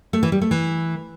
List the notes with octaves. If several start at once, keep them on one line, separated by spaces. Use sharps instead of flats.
A3
E3
G3
A3
E3